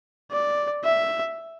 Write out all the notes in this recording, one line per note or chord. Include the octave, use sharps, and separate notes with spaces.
D5
E5